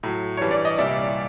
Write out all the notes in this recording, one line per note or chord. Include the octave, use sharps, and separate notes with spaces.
A2 F#3
G2 E3 G3 C#5
D5
D#5
C2 A#2 G3 D5 E5